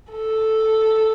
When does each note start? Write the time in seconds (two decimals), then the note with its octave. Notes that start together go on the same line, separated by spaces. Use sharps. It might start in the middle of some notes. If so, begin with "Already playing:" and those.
0.12 A4